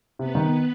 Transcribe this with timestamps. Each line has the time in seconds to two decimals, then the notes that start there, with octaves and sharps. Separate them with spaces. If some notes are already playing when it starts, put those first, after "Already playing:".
0.19 C3 B3 B4
0.35 D#3